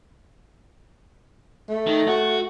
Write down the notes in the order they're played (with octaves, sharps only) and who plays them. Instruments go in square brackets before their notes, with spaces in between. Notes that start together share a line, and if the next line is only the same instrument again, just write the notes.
[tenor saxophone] A3
[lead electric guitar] D#3
F#4